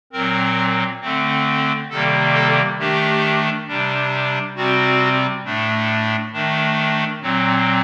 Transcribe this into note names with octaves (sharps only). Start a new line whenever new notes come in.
A#2 F#3 C4 A#4
D3 A3 C4
C3 D#3 G3 A#3 A4
A4
D#3 A3 D4 G4
C3 G3 D4
C3 G3 C4 F#4
A2 A3 D4
D#3 A3 D4
A#2 F#3 C4